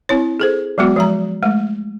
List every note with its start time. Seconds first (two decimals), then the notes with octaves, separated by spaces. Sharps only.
0.09 C4 E4 C#5
0.40 G#4 A4 C5
0.78 F#3 G#3 B3 F#4
0.96 F3 G#3 A#5
1.43 G#3 A3